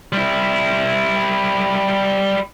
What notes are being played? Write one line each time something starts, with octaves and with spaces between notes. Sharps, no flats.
G3 E4